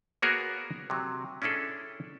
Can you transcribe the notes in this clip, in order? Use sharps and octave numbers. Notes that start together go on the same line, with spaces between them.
A#3 B3 F#4 G#4 A#4 C#5
C3 F#3
C#4 D4 E4 G#4 A4